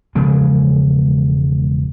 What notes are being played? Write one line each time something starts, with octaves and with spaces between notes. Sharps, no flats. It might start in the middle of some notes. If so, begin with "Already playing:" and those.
E1 C#3 F3 G#3